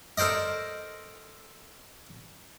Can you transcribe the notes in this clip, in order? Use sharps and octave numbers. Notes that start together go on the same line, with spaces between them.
A4 A#4 C5 D5 D#5